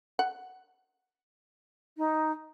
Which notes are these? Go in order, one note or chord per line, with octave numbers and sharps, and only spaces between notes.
F#5
D#4